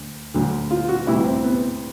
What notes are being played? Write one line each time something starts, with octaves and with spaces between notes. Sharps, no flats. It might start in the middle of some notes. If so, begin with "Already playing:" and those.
Already playing: D2
D2 D3 F#3
F4
F#4
D2 C3 E3 G3 E4
C4
B3